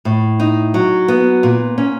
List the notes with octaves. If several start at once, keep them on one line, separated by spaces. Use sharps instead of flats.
A2
D#4
F#3
B3
A#2
C#4